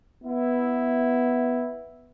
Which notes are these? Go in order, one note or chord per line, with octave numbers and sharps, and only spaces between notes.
B3 E4